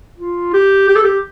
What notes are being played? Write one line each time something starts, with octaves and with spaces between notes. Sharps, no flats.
F4
G4
G4
A4
G4